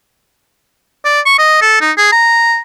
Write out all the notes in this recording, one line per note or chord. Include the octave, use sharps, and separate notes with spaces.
D5
C#6
D#5
A4
D#4
G#4
A#5